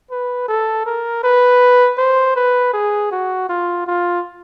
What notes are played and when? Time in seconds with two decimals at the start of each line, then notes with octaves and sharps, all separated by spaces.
0.11 B4
0.48 A4
0.86 A#4
1.24 B4
1.98 C5
2.36 B4
2.74 G#4
3.11 F#4
3.49 F4
3.87 F4